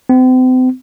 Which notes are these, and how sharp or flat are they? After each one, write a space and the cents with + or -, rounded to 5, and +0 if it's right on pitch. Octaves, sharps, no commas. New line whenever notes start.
C4 -40